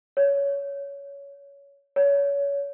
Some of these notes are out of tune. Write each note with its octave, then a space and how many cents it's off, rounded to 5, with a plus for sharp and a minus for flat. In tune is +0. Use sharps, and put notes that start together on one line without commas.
C#5 +15
C#5 +25